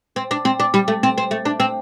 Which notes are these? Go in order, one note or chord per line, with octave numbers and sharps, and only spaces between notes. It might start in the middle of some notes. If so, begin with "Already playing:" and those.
C4
D4
C4
D4
G3
A3
C4
C4
A3
D4
C4